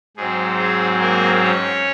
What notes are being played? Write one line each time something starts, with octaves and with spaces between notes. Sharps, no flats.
G#2 F#3 C4 G#4
G#4
A#3 A#4
C#4 C#5